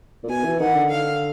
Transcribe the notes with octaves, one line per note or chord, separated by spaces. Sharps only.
A#2
B2 G#5
E3
D#3 F#5
D3
F5